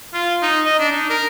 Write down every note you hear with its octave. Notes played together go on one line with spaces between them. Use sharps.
F4
D#4
D#5
D4
D#4
A#4